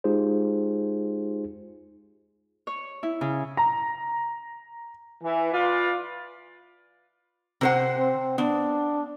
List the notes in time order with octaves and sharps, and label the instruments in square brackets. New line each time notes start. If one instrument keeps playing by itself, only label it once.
[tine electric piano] G#3 D#4 F4 G4 G#4 C5
[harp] C#5
E4
C#3
[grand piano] A#5
[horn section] E3
F4 B4 D5
[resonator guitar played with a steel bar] C3 C5 F#5
[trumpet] C4
[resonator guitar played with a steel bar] B3 [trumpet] D4